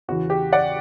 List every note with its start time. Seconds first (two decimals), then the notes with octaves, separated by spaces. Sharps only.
0.08 E2 C#3 E3 F#4
0.30 G4
0.53 D5 F#5